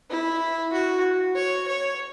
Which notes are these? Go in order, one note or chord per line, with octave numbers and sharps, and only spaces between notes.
E4
F#4
C#5
C#5